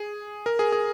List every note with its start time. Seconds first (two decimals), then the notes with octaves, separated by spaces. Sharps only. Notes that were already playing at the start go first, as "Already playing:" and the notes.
Already playing: G#4
0.46 A#4
0.59 G#4
0.72 G#4